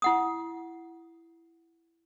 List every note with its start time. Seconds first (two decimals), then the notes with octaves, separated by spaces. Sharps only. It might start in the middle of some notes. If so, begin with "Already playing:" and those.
0.02 E4 F#5 D#6